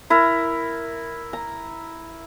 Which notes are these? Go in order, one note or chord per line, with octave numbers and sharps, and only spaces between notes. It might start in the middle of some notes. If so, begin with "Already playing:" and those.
E4 A#4
A#5